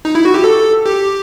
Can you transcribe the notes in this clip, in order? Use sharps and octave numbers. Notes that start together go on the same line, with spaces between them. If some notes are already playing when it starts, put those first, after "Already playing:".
D#4
E4
F#4
G4
A4
G4